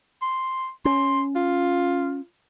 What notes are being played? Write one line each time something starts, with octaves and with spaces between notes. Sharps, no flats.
C6
C#4 C6
F4